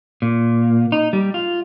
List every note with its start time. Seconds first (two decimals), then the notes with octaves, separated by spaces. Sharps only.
0.22 A#2
0.92 D#4
1.13 G3
1.34 F4